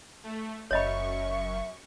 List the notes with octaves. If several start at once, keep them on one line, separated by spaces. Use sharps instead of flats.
A3
F#1 F#2 C#5 D#5 E5 B5 C#6